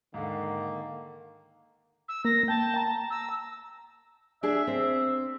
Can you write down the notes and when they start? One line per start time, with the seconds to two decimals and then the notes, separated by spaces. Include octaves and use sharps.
0.14 G#2 D3 D#3 A#3
2.08 E6
2.25 A#3 A#6
2.48 G5 A5
2.76 A#5
3.10 E6
4.43 D4 G#4 E5
4.67 C4